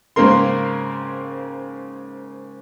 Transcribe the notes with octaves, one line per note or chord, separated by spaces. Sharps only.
G#2 C#3 A#3 C4 A#4 C6